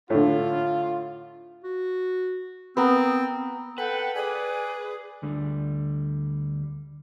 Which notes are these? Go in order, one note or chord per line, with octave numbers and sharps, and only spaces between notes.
A2 D3 F4
F#4
B3 C4 A#4
A4 B4 F#5 G5
G#4 D5 G#5
D2 D3 G3